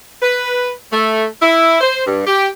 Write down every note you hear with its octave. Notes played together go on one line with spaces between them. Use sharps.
B4
A3
E4
C5
G2
G4